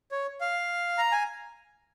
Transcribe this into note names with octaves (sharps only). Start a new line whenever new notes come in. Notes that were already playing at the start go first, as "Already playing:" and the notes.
C#5
F5
A#5
G#5